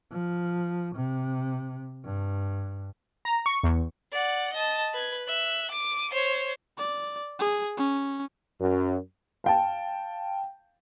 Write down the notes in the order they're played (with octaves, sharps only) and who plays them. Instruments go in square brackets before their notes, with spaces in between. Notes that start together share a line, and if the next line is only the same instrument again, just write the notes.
[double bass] F3
C3
G2
[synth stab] A#5
C#6
E2
[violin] D5 F#5
D#5 A5
B4 G#6
E5 F#6
D6 D#7
C5 C#5
[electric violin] D5
G#4
C#4
[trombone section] F#2
[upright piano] F5 G5 A5